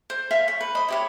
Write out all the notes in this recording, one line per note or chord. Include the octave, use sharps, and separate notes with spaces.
C5
E5 F5 G#5 C6
C#5
B4
C5 D#5 B5
E4 G4 C#5